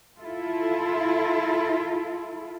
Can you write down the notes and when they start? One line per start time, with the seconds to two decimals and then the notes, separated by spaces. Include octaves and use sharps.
0.20 E4 F4 A4